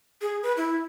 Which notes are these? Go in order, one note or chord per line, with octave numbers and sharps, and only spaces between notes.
G#4
B4
E4